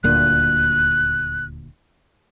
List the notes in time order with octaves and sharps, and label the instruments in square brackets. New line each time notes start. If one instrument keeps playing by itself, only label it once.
[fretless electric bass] D#1 D2 A#2 [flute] F#6